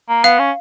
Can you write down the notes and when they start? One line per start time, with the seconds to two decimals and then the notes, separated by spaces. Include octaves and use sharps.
0.09 A#3
0.24 B3 F5
0.39 C#4